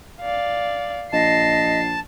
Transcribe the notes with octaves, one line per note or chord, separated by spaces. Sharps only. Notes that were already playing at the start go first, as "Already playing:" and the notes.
D5 F5
A#1 D#5 A5 C7